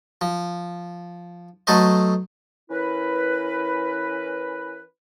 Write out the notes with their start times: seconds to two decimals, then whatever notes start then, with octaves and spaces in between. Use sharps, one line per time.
0.21 F3
1.67 F#3 A3 A4 B4 C5 D#5
2.70 E3 C#4 E4 A#4 B4